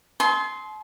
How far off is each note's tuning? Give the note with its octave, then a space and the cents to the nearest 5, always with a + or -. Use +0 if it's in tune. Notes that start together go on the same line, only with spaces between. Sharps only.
A5 -45 C6 +0 D#6 +45